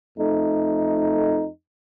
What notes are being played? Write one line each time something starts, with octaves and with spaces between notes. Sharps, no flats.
F2 A3 D#4